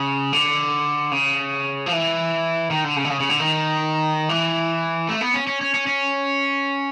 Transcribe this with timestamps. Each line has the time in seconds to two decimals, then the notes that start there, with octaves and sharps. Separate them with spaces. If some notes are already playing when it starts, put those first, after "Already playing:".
Already playing: C#3
0.33 D3
1.11 C#3
1.86 F3
1.92 E3
2.70 D#3
2.84 D3
2.96 C#3
3.05 D3
3.10 C#3
3.20 C#3
3.29 D3
3.39 D#3
4.29 E3
5.09 A3
5.21 B3
5.34 C#4
5.47 C#4
5.61 C#4
5.74 C#4
5.87 C#4